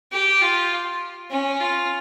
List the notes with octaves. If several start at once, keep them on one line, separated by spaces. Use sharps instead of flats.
G4
F4
C#4
F4